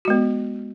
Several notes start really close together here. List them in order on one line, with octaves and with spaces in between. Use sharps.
F#4 G#3 B3